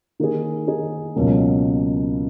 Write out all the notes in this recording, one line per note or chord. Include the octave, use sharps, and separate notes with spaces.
D#3 A#3 D#4 G#4
D#3 A#3 D#4 G#4
C#2 B2 F#3 A#3